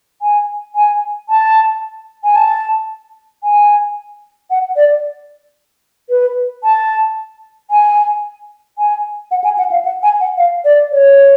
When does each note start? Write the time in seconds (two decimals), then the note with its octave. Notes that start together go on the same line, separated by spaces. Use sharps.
0.22 G#5
0.75 G#5
1.29 A5
2.24 G#5
2.36 A5
3.43 G#5
4.51 F#5
4.76 D5
6.10 B4
6.64 A5
7.71 G#5
8.78 G#5
9.31 F#5
9.44 G#5
9.58 F#5
9.72 F5
9.85 F#5
10.03 G#5
10.20 F#5
10.38 F5
10.65 D5
10.92 C#5